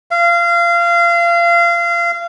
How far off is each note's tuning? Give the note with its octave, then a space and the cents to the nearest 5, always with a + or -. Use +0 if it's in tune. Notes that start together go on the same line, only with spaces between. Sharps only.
F5 -25